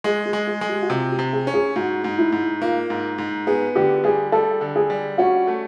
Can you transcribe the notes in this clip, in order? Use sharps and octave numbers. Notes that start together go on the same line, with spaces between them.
G#3 G#4
G#4
G#3
G#4
G#3
G4
F#4
C3 F4
G4
C3
G#4
C#4
G#4
G#2 F#4
G#2
E4
G#2
A#3 F4
G#2
G#2
B3 G#4
D3 G4
G3 G#4
G3 A4
D3
G#4
G3
C#4 F#4
A3